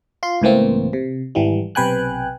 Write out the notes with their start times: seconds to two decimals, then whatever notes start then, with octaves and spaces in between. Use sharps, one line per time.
0.23 F4 C6
0.42 C#2 A2 E3 A#3 C4
0.93 C3
1.35 G#1 E3 G3
1.75 B1 C3 B4 G5 G#5 F#6